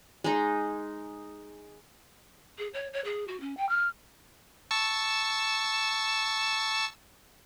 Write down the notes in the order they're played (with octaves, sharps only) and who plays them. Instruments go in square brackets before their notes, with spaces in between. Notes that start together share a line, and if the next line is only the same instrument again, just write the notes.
[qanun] G#3 D#4
[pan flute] G#4
C#5
C#5
G#4
F#4
C#4
G5
F6
[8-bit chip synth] A5 C#6 E6